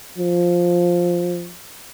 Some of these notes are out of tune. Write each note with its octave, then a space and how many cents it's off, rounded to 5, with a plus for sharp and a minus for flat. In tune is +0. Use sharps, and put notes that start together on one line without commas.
F3 +5